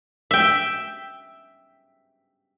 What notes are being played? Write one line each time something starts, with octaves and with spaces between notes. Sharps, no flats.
E5 G5